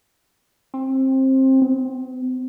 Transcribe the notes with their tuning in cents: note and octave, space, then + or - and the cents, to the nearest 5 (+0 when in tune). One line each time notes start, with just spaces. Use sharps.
C4 +20
C4 -45